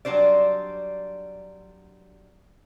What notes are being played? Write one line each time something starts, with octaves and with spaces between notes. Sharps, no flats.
F#3 G3 D4 C5 D5